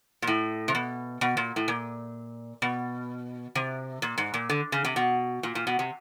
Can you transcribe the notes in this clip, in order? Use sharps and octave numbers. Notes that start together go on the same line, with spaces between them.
A#2
A2
C3
B2
B2
A#2
A2
A#2
B2
C3
A#2
G#2
A#2
D3
C#3
C3
B2
A#2
A#2
B2
C3